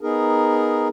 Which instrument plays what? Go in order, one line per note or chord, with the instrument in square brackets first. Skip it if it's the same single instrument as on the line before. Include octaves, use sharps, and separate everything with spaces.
[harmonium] B3 D#4 G#4 A#4